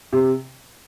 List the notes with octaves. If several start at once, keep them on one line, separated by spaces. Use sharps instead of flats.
C3